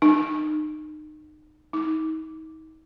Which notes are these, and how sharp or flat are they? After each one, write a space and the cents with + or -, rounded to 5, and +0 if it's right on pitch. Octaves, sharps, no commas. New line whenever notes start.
D#4 -30
D#4 +35